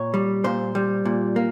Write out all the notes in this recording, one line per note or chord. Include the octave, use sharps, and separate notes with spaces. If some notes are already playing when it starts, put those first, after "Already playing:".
Already playing: A#2 C#5
G3
A#2 C5
G3
A#2
A#3